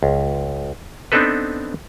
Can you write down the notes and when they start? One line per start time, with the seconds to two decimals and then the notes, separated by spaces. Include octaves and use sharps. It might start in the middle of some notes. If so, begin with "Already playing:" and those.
0.03 C#2
1.12 B3 C4 D4 D#4 A4 B4